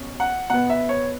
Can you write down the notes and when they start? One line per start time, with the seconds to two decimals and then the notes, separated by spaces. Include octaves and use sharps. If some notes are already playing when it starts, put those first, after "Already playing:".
Already playing: B2 C#4
0.20 F#5
0.50 B2 B3 F#5
0.70 E5
0.89 C#5